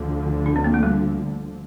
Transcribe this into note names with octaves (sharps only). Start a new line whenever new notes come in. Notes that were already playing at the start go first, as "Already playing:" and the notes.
Already playing: D2 D3 F3 A3
D4
C4
A#3
A3
G3